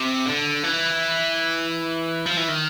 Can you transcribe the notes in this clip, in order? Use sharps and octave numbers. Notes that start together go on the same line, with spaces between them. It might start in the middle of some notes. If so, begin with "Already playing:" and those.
Already playing: C3
D3
E3
F3
E3
D#3